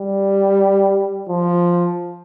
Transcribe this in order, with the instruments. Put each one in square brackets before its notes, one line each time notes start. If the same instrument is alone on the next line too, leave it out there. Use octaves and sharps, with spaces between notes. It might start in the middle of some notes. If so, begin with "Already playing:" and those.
Already playing: [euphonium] G3
F3